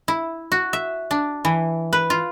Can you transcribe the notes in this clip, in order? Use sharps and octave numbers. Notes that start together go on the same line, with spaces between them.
E4
F#4
E5
D4
E3
B4
F4